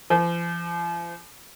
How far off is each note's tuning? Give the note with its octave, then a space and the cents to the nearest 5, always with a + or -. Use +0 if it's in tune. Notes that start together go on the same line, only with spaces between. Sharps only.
F3 -40